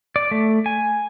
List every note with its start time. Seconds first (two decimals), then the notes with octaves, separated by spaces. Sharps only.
0.16 D5
0.31 A3
0.66 G#5